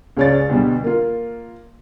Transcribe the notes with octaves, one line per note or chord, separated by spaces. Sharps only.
C#2 G#4 C#5 D5 A6
D2 B2 G3
A#3 F4